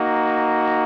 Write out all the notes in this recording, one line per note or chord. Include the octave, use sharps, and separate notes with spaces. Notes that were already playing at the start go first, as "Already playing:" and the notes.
Already playing: A#3 D#4 F#4